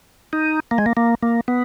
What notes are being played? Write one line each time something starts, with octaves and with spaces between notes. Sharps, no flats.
D#4
A#3
G#3
A#3
A#3
A#3
B3